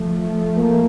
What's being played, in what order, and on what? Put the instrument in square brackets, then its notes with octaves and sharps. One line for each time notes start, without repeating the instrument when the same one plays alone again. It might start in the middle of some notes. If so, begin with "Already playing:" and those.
Already playing: [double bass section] F3 A3
[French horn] A#3